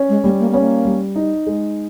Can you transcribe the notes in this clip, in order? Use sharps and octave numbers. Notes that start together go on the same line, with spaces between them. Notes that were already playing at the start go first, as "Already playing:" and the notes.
Already playing: C#4
G#3
G3 A#3
A#3
B3 C#4
A#3
G3
D#4
G#3